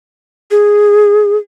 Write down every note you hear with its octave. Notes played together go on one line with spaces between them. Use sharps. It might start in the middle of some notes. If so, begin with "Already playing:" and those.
G#4